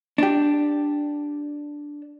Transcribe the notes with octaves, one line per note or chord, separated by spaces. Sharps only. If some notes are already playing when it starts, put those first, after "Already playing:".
D4 G4